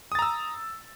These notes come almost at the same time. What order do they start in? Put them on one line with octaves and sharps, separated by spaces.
D#6 A6 A#5 E6